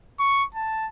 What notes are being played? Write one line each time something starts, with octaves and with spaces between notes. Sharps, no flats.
C#6
A5